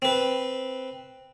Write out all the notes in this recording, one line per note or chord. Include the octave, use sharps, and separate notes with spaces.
C4 B4